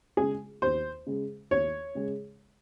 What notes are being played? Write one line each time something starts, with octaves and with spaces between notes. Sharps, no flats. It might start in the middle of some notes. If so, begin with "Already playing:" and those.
C#3 G#3 G#4
D#2 C5
C#3 G#3
D#2 C#5
C#3 G#3